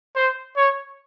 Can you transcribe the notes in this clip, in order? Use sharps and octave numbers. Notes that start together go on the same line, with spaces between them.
C5
C#5